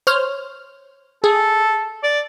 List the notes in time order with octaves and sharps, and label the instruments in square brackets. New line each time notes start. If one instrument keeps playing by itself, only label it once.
[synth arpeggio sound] C5 C#5 F6
[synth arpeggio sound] G#4 [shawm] A4
[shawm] D5